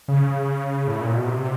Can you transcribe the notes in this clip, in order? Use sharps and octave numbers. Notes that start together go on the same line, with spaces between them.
C#3
A2
A#2
B2
C3